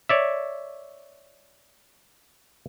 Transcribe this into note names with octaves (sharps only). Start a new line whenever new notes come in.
C#5 D5 E5